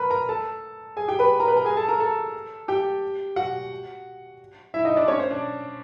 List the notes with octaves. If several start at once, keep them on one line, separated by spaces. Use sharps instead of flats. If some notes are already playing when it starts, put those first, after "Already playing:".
Already playing: A#4 B4 B5
A#4 A#5
A4 A5
G#4 G#5
G4 G5
B4 B5
A#4 A#5
B4 B5
A#4 A#5
G#4 G#5
A4 A5
A#4 A#5
A4 A5
G4 G5
F#4 F#5
E4 E5
D#4 D#5
D4 D5
C#4 C#5
C5
D4 D5